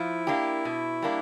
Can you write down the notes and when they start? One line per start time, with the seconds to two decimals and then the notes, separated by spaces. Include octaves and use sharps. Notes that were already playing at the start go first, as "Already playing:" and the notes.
Already playing: F3 E4
0.27 A#3 D4 G4
0.65 B2
1.02 G3 A#3 D4